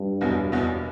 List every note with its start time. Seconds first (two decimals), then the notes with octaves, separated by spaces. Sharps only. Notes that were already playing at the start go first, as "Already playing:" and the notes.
Already playing: G2
0.21 F#1 E2 B2 F#3
0.52 F#1 E2 B2 F#3